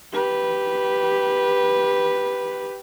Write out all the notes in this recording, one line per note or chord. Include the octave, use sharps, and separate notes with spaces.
G4 B4